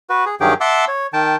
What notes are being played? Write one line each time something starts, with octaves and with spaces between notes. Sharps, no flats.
F#4 B4
G#4
G2 D#3 F#3 G4 G#4 G5
E5 F#5 A5 C6 D6 E6
C#5
D#3 G5 A5